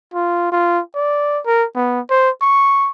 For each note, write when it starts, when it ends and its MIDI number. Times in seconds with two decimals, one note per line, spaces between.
0.14 0.48 65
0.52 0.81 65
0.95 1.40 74
1.46 1.65 70
1.76 2.00 59
2.10 2.30 72
2.42 2.91 85